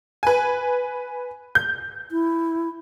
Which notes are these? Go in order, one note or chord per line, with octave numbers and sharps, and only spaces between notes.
B4 G#5
G6
E4